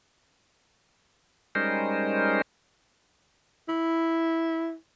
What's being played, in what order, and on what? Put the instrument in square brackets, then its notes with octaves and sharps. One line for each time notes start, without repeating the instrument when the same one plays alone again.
[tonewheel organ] G3 G#3 C#4 D#4 A#4 C5
[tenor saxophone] E4